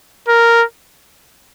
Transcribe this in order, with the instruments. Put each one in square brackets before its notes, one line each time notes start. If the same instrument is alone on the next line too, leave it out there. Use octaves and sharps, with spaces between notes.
[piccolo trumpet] A#4